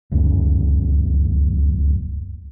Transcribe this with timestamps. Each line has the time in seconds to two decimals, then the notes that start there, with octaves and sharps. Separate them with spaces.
0.12 D1 C#2 F#2 C#4